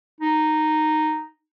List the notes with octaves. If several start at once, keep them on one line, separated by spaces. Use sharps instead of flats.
D#4